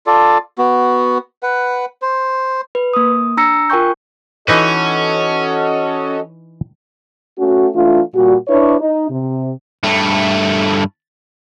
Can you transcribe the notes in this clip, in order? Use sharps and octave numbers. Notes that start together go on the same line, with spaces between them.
F4 A4 D5
B3 F#4
B4 F#5
C5
B4
A#3 D#6
D4 A#5 E6 A#6 C#7
F4 A#4 G5 G#5 C#6 G6
E3 C#4 D#4 F#4 A4 B4 D#5
A3 C#4 F#4
E3 A3 D4 F4
A#2 G3 F#4
D4 E4 B4 C#5
D#4
C3
G2 A3